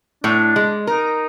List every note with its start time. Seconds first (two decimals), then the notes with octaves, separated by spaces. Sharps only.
0.24 A2 D4
0.56 G#3
0.87 D#4 A#4